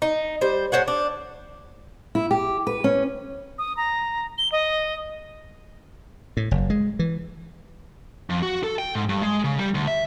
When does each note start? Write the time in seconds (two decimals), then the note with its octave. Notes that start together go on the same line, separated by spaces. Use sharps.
0.02 D#4
0.41 G3 C5
0.72 A2 C5 C#5 F#5
0.88 D4
2.15 E4
2.31 G4
2.67 B4
2.84 C#4
3.58 D#6
3.77 A#5
4.38 G7
4.52 D#5
6.37 A2
6.51 F#1
6.70 G#3
6.99 E3
8.30 F2
8.42 F#4
8.63 A4
8.79 G5
8.95 G#2
9.09 G2
9.22 G#3
9.44 C#3
9.59 G3
9.75 D2
9.88 E5